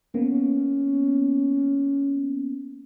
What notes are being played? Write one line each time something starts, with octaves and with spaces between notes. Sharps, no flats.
A#3 B3 C#4